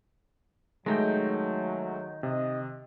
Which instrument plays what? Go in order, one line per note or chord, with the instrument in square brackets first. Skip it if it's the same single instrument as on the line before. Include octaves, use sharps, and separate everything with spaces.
[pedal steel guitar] D#3 D#4 G5 [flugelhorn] F#3 [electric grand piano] G#3 A3
[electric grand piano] C3 [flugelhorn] D#5